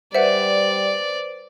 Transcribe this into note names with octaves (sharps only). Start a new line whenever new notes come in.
G3 B4 C5 D5 E5 F#5